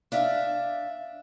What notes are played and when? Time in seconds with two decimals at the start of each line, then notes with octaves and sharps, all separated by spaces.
0.12 D4 E5 F5